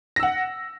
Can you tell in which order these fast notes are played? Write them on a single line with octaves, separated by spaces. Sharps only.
A#6 E6 F#5